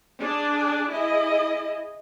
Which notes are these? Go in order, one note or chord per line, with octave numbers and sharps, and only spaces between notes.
D4 G#4 D5
E4 G#4 D#5